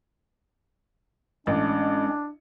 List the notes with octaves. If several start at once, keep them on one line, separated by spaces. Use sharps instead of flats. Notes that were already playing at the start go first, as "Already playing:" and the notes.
A1 G#3 C#4 D4